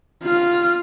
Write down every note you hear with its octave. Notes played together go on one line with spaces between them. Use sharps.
F4